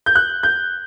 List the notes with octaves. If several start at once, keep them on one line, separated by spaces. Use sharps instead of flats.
G6
F#6
G6